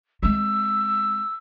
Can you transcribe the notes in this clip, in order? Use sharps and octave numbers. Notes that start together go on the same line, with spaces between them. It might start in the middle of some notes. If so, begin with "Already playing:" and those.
G#3 C4 E6